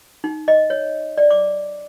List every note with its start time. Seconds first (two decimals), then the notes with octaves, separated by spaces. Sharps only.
0.24 D#4
0.48 D#5
0.70 C#5
1.18 D5
1.31 D6